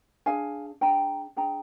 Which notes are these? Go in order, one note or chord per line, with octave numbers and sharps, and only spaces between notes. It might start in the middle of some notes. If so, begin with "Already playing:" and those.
D4 G#4 F5 G#5
D4 G#4 G5 A#5
D4 G#4 G5 A#5